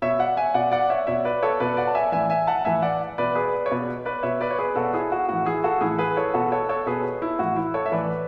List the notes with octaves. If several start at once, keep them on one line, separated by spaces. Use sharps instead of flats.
B2 C#5 E5
D5 F#5
E5 G#5
B2 D5 F#5
D5 F#5
C#5 E5
B2 C#5 E5
B4 D5
A4 C#5
B2 B4 D5
D5 F#5
A5
E5 G#5
A2 E3 E5 G#5
E5 G#5
F#5 A5
A2 E3 E5 G#5
D5 F#5
B2 B4 D5
G#4 B4
C#5
B2 B4 D5
B4 D5
B2 C#5 E5
B4 D5
C#5
G#4 B4
B2 F#4 A4
E4 G#4
F#4
A2 E3 F#4
E4 G#4
F#4 A4
A2 E3 E4 G#4
G#4 B4
A4 C#5
B2 F#4 A4
A4 C#5
A4 C#5
B2 G#4 B4
E4
A2 E3 F#4
E4
A4 C#5
E5
A2 E3 B4 D5